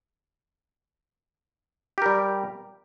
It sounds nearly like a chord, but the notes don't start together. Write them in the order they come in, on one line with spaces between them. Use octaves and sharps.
G4 A#4 G3